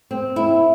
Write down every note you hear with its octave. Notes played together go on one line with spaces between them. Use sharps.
C4
E4